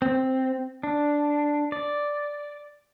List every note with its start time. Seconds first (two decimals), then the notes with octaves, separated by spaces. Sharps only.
0.02 C4
0.83 D4
1.72 D5